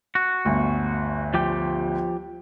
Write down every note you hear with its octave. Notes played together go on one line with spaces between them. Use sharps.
F#4
G1 D2
F3 G4 G5